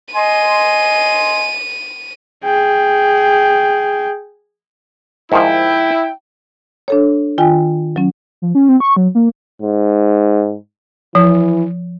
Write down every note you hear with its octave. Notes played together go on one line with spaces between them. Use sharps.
D#5 G#5 C6 D#7
G#4 G5
G#2 D#3 F3 E4 G5
D4 A4 C#5
D#3 F4 G5 G#5
F#3 C#4
F3
C#4
C4
C#6
F#3
A#3
G#2
E3 F3